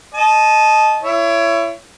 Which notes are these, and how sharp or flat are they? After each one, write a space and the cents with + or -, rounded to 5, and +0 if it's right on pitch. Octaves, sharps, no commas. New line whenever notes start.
D#5 +0 A5 -20
E4 +30 C#5 +15